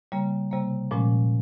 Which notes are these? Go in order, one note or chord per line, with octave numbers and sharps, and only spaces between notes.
C#3 G3 A#3
C3 G3 A#3
A#2 F3 G#3 C#4